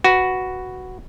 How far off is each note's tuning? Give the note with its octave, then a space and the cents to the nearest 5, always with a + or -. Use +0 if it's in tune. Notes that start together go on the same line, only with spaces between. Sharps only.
F#4 +0 B4 +0